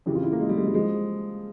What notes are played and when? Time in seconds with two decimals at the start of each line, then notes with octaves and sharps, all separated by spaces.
0.06 F2 C#3 E3 G4
0.15 F4
0.23 E4
0.32 A#3
0.40 G#3
0.49 G3
0.57 G#3
0.66 G3
0.74 F3 G#3